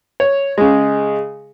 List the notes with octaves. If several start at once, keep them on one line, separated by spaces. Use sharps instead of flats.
C#5
C#3 G#3